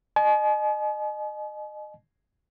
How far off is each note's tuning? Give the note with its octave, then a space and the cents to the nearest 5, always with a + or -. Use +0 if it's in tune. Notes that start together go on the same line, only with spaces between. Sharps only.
D#5 -30 G#5 +45